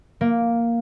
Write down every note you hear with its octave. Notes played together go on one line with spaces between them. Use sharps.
A#3